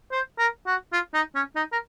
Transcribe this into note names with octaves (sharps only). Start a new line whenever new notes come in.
C5
A#4
F#4
F4
D#4
C#4
D#4
A#4